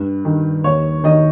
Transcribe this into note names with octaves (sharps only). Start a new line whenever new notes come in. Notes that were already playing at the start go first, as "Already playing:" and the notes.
Already playing: G2
D#3
D#2 C#5
D#3 D#5